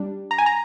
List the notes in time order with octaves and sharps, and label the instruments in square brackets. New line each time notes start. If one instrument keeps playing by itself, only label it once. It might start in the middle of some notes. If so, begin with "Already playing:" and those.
Already playing: [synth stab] G3 D4
A#5
G#5
A#5